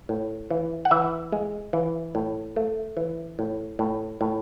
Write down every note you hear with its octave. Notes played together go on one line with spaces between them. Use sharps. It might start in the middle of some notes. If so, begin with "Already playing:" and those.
A2
E3
F#5
E3 E5
G#3
E3
A2
A3
E3
A2
A2
A2